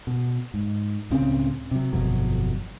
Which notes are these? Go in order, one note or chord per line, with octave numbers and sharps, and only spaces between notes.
B2
G#2
C#2 A2 C#3 C4
C3 F#3
G1 F2 B2 F#3